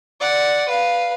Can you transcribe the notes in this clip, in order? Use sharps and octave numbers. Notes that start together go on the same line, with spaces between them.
D5 F#5
B4 F5